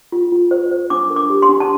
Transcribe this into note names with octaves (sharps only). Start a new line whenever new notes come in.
F4
F4
C5
C5
D4 D6
A#4
D6
G4
C6
D4
A5